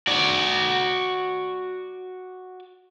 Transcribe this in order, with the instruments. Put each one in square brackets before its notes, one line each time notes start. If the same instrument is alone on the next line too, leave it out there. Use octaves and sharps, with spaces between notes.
[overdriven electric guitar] F#4 D5